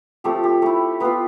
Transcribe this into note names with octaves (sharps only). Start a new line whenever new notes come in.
F3 A3 C4 G4
G4
A3 E4
B3 F4 B4